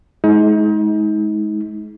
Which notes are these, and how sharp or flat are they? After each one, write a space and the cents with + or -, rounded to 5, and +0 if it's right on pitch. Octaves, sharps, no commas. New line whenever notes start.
G#3 +30 D#4 +35